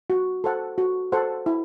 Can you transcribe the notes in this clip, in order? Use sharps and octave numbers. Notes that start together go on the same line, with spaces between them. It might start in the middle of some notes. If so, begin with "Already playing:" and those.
F#4
A4 C5 F#5
F#4
A4 C5 F#5
E4